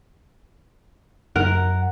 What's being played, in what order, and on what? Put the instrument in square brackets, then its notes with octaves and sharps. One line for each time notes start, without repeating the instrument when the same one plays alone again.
[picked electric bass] F#2 [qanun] A#4 [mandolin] F#5